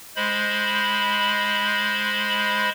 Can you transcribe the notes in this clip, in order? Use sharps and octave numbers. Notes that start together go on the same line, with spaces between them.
G#3 C5 B5